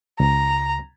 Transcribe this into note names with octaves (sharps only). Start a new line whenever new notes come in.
C#2 A#5